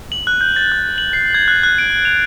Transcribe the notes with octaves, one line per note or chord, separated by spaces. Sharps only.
F#7
F#6
G6
A6
F#6
F#7
C7
G#6
F#6
F#6
D7
F7